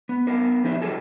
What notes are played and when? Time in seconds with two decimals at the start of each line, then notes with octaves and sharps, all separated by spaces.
0.09 B3
0.27 B3 A#4 C5
0.64 F3 D#4 E4 G4 C5 E5
0.82 G3 F4 G#4 A4